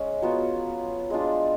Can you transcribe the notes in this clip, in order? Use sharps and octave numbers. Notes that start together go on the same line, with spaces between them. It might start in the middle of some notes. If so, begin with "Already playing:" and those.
Already playing: G#3 C#4
F#3 B3 F4
G#3 D4 F4